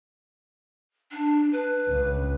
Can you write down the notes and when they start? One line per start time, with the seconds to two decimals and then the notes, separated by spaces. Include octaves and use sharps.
1.11 D4
1.52 B4
1.89 C#2